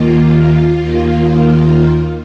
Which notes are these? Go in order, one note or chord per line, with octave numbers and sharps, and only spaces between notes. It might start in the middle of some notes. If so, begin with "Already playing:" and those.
Already playing: D#2 D#3 A#3 F4
D#2 D#3 A#3